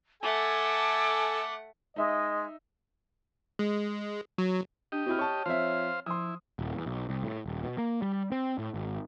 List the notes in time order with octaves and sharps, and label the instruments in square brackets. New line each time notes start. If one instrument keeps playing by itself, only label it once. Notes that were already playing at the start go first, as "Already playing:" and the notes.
[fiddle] A3 F#5 [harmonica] A4 G#5 [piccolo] D6
[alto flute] G#3 [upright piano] D#4 E5 [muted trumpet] D#5
[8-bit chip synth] G#3
F#3
[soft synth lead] D4 [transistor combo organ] G4 D#5
[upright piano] C4 E4 F6 [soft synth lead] F#4
[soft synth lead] C#5 [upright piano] A5 C#6
[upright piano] F3 C4 E5 [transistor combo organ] C5 F5
[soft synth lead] F3 [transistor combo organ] E4 [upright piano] C6 D#6
[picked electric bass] D#1
E2
B1
C2
A2
D#1
B2
A#3
G3
C4
A2
G#1